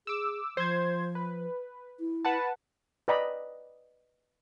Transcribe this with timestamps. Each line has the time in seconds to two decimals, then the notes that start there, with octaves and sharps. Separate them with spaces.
0.07 G#4 D6 E6
0.57 F3 C5 G#6
1.15 B4
2.00 E4
2.25 B4 F#5 A5
3.08 B4 D5 D#5 G5 A#5 B5